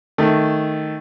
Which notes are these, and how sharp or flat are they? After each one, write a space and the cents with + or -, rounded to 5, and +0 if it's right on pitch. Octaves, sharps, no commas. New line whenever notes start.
D#3 +0 A3 +0